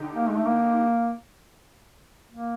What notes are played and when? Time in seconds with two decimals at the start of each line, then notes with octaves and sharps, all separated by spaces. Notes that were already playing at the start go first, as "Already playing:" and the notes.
Already playing: D3 D#4 G4
0.15 A#3
0.29 G#3
0.37 A3
0.46 A#3
2.30 A#3